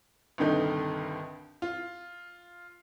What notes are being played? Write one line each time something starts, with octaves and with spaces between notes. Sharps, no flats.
C2 G2 D3 D#3 D#4 G6
F4